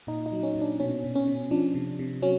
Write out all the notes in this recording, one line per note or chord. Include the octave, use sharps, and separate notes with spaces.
A#2 D#4
D#4
F#3
C#4
A#2
D4
B2 C#4
B2
C#4
B2
F3 D4
C3
C3
F#3 C#4